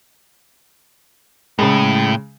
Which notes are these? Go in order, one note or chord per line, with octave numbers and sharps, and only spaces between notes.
A2 C#3 G#3